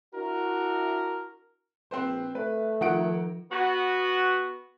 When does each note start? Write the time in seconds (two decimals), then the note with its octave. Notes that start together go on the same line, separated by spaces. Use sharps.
0.14 D4 E4 F#4 A#4
1.91 A#1 C4 B4 C5
2.35 A3 B4
2.81 D#3 F3 F4 A4 F#5 D7
3.51 B3 F#4